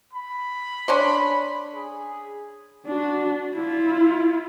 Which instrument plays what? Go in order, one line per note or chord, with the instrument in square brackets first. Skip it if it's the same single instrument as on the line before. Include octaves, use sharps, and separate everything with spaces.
[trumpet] B5
[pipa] C#4 D4 C6
[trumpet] G#4
[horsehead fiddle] D4 F#4
E4 F4